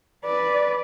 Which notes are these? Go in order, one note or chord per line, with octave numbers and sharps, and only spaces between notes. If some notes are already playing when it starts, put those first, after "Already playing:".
B4 D5